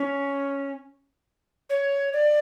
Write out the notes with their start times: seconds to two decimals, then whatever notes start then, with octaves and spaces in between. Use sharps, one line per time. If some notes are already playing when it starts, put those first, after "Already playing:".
Already playing: C#4
1.70 C#5
2.13 D5